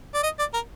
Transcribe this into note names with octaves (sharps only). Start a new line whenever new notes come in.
D5
D#5
D5
A#4